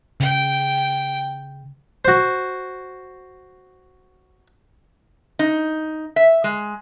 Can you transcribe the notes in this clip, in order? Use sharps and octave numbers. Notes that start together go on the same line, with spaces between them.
C#3 G5
F#4 C5
D#4
E5
G#3